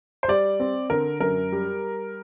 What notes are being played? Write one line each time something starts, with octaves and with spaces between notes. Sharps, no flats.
C5
G3 D5
C4
D3 A#4
F#2 A#4
G3